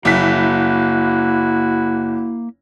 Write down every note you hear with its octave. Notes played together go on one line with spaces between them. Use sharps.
F#1 A#3 E4 F#4 E5 B6